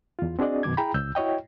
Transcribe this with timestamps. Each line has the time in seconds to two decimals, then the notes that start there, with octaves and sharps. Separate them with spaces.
0.19 E2 F4
0.39 C4 D4 F#4 G#4 D5 D#5
0.63 F#2 B2 D#3 D6 G#6
0.77 E4 G#4 G5 A#5 B5
0.94 C#2 E6 G6
1.15 E4 F#4 C#5 D#5 G5